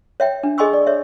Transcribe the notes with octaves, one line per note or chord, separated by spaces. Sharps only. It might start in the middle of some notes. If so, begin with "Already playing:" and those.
C#5 E5 G5
D4
G#4 D#5 G#5 C6 C#6 E6
D5
C#5 E5